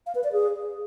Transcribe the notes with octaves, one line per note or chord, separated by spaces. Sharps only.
F5
B4
D5
G#4